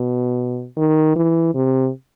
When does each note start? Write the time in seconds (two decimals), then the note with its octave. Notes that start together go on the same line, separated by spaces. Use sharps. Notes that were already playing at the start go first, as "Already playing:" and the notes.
Already playing: B2
0.77 D#3
1.16 E3
1.55 C3